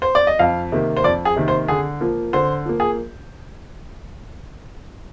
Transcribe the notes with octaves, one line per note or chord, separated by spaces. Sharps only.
C5
D5
D#5
F2 F5
C3 D#3 A#3
C5
F2 D5
G#4
C3 D#3 A#3
C5
D3 G#4
F3 A#3
D3 C5
F3 A#3
G#4